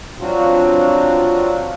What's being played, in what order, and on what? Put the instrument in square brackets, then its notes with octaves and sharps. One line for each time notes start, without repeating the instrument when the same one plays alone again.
[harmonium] F#3 C4 D4 F4 F#4